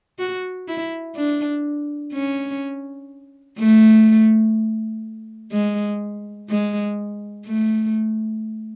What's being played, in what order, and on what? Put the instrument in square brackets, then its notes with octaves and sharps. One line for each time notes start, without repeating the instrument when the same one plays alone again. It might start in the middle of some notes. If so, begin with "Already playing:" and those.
[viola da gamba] F#4
E4
D4
C#4
A3
G#3
G#3
A3